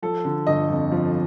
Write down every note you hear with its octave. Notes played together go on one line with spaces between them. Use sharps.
F3 A4
D3
G1 D#5
F2
F3